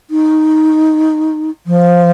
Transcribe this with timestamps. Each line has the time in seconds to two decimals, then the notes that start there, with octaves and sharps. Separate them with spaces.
0.10 D#4
1.66 F3